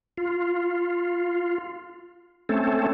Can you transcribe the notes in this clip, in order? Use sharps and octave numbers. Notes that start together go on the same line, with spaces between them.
F4
A3 C4 C#4 A4